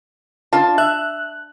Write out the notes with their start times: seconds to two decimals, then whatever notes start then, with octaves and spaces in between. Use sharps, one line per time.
0.53 D4 F4 A5
0.78 E5 F#6